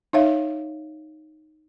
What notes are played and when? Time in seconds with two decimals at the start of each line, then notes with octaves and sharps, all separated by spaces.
0.13 D#4 C#5 E5 F5